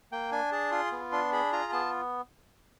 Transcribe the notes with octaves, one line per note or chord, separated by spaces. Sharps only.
A#3 G5
D4 G#5
G#4 A5
F4 C6
B3
D4 C6
G#4 B5
F4 A#5
B3 A5